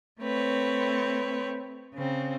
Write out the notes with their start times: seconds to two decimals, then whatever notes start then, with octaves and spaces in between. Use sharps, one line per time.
0.21 A3 C4 B4 C#5
1.94 C#3 C4